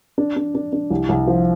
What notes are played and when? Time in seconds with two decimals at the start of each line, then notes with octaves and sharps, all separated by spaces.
0.18 D4
0.37 D4
0.55 D4
0.73 D4
0.90 C2
1.09 C2
1.27 F3